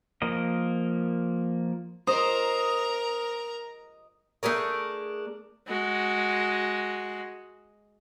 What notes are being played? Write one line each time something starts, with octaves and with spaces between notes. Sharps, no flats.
F3 A#3 A#4 D#5
A#4 C5 D#5 A#5
A3 D4 G#4 A#4
G#3 F#4